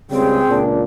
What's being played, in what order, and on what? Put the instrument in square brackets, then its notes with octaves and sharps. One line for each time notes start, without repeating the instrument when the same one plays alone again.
[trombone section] C#2 C#3 G3 [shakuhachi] C4 [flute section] G#4 G5
[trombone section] C#2 A#2 D4